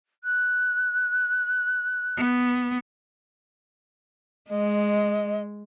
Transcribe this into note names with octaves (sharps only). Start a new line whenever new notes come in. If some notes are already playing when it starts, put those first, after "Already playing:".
F#6
B3
G#3 D#5